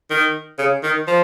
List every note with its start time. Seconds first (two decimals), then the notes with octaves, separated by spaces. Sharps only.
0.10 D#3
0.58 C#3
0.83 D#3
1.07 F3